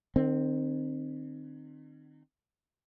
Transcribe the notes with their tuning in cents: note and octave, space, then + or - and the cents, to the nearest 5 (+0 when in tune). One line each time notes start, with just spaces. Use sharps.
D#3 -35 C4 +0